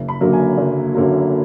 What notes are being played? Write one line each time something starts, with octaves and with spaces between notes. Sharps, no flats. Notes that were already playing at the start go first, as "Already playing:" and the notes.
Already playing: F#1
B5
F#2 D3 F#3 A#3
G#5
F#1
F#2 D3 F#3 A#3